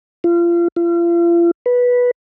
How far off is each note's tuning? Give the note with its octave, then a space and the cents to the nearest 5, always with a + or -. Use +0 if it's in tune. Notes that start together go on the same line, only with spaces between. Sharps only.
F4 -30
F4 -40
B4 -10